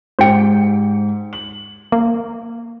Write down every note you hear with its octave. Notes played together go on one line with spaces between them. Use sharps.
G#2 G4 C5 G5 C#7
F#7
A#3